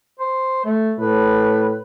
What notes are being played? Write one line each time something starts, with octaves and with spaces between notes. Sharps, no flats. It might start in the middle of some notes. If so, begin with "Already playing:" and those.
C5
A3
A2 B4